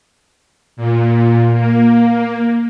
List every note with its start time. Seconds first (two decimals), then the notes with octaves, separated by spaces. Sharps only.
0.77 A#2
1.53 A#3